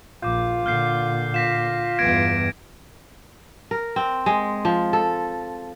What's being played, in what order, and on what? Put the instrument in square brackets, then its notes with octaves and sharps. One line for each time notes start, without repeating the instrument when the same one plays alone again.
[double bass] A#1 [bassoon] F4 [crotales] D6 G6
[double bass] A#2 D3 [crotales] F6 G6 C7
[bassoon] F4 [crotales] A#6 B6 E7
[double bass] E2 G2 [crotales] G#6 A#6 D7
[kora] A#4
C4
G#3
F3
A4